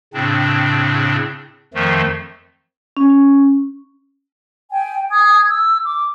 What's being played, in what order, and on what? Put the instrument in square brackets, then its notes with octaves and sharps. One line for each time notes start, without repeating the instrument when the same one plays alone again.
[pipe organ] A2 C#3 C4 D4
F2 D#3 F3 A3
[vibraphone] C#4
[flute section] G5 G#5
G#5 D#6 G#6
E6
D6